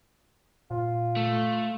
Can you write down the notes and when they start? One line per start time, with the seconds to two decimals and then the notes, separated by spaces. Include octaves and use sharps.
0.71 A#2 F4
1.17 A3